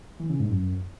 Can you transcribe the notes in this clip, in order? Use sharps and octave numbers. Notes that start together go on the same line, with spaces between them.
E3
C#3
G#2
F#2